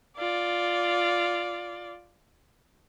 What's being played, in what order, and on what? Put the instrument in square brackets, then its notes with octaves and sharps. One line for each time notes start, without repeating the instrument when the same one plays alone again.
[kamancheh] F4 D5